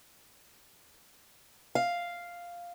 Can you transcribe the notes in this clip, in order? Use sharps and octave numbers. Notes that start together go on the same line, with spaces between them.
F5